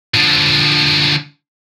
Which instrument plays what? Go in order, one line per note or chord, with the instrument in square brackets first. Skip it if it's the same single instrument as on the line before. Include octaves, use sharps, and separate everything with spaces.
[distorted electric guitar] D3 F3